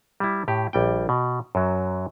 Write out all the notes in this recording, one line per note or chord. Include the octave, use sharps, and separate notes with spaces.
G3 E4
A2 G4
A#1 G3 G5
B2
F#2 F#3